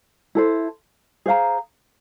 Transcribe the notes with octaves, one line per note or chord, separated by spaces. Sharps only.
E4 A4 C5
G#4 C5 F5 A#5